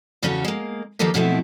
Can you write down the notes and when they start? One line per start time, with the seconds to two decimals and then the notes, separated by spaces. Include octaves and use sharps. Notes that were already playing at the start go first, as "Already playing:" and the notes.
0.23 E2 C#3 C#4 F#4 A4 C#5
0.44 G#3 A#3
0.99 D#3 F3 F#3 A#3 G4 A4
1.14 F#2 B2 F3 A3 C4 E4